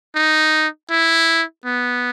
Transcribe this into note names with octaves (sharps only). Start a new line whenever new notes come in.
D#4
E4
B3